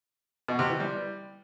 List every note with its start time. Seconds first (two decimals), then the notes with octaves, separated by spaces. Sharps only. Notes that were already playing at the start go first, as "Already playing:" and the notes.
0.48 B2
0.59 C3
0.69 E3
0.80 G3